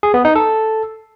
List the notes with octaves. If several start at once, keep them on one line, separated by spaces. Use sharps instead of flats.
G#4
B3
D#4
A4